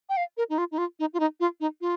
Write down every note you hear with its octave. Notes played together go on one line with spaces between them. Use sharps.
G5
F5
A#4
D#4
F4
D#4
F4
D#4
F4
D#4
F4
D#4
F4